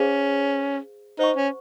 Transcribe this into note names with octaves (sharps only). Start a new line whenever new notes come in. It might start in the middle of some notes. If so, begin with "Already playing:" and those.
Already playing: C#4 G#4 C5 F5
D#4 C5 F#5 C#6
C#4